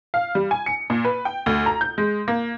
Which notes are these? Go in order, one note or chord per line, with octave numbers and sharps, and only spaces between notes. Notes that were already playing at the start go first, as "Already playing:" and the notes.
F5
G3
G#5
C#7
A#2
B4
G5
D2
A#5
G6
G#3
A#3